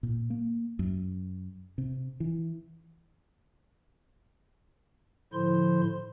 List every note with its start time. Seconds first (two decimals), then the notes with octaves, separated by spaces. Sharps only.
0.03 A#2
0.30 A#3
0.79 F#2
1.78 C3
2.20 E3
5.33 A2 D3 F3 E4 C5 C6